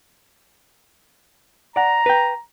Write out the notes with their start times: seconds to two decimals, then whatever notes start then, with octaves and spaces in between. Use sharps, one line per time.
1.76 D5 F#5 A#5
2.06 B4 G5